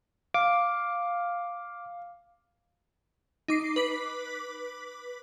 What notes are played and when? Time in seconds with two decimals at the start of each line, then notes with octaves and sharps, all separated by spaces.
0.34 F5 D6
3.48 D#4 D6 C7
3.76 B4 D6 B6